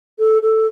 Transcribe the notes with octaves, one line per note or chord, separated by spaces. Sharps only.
A4
A4